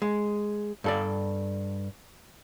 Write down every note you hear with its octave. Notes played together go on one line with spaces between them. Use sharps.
G#3
G2 A4 D5